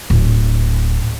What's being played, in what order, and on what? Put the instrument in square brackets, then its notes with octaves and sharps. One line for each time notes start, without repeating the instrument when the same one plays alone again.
[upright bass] D1